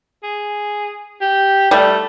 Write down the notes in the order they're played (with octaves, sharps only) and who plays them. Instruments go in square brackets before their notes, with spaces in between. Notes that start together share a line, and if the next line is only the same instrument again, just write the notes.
[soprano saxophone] G#4
G4
[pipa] G3 [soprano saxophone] A3